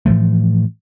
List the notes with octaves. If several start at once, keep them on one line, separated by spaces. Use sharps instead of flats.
A2 E3 F3 A3